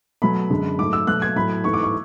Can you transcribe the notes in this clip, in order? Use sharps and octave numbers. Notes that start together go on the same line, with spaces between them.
B2 F#3 A3 B5
F#2 D3 G#3
G#2 F#3 A3 D6
E6
B2 F#3 A3 F#6
G#6
A2 F#3 A3 B5
G#2 E3 A3 C#6
D6
C#6